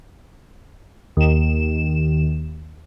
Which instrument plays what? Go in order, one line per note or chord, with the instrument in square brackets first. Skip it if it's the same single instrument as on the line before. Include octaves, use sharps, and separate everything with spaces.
[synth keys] D#2 E7